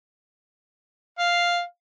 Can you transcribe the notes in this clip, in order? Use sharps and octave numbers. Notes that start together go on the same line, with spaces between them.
F5